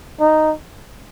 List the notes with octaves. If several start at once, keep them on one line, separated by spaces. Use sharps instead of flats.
D#4